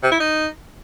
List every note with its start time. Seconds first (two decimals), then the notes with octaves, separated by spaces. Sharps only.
0.03 C3
0.11 E4
0.20 D#4